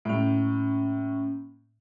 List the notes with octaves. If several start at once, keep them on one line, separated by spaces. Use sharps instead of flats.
A2 A#3 C#4